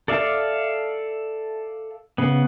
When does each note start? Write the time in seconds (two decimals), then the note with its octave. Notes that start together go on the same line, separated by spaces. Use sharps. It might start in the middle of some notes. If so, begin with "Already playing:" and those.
0.08 A4 D5 E5 F5
2.18 C#3 B3